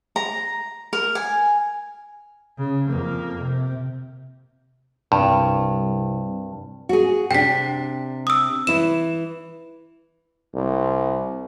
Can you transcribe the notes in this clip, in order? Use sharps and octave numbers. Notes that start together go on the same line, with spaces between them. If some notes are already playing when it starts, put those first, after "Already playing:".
A#5
A#4
G#5
C#3
F2 A#3
C3
C2 G2
F#4 G#4
C3 D4 G5 B6
D#6 E6
E3 E4 E7
C2